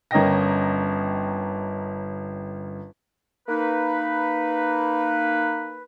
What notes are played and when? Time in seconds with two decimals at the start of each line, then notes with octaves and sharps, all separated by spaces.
0.11 G1 C#4 A#4 D#5 G5 A#6
3.48 A#3 D#4 B4